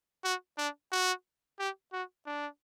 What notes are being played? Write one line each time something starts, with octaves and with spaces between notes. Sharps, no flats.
F#4
D4
F#4
G4
F#4
D4